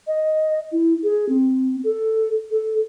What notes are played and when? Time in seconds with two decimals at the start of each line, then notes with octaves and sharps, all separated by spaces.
0.07 D#5
0.72 E4
1.03 G#4
1.29 C4
1.84 A4
2.51 A4